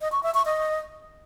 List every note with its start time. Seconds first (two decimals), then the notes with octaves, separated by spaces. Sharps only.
0.01 D#5
0.12 C#6
0.23 E5
0.34 C#6
0.46 D#5